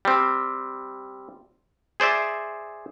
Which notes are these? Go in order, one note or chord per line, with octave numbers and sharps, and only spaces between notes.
G3 C4
G#4 C5 D5 E5